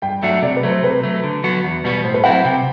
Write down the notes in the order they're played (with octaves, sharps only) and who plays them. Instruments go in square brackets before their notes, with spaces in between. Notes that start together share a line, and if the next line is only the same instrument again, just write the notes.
[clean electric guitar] G2 [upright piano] G5
[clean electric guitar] F#3 A3 D4 F#4 [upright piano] E5
[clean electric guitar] C3 [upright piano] D5
[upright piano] B4
[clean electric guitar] F#3 A3
[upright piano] C5
[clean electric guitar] C3 [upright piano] B4
[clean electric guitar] F#3 A3
D3
F#3 B3 F#4
E2
B2 G3 B3 F#4
[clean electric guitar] A2 [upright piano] C5
[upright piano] B4
[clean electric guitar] F#3 C4 E4 [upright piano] F#5
[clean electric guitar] C3 [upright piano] G5